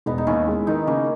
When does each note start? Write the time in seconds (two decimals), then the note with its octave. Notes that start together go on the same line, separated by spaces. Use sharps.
0.06 E1 B3 D#4
0.18 D#4
0.27 D#2 C#4 E4
0.48 G#3
0.67 D#3 B3 D#4
0.87 C#3 A#3 C#4